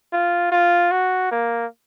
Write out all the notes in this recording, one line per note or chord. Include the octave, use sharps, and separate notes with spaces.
F4
F4
F#4
A#3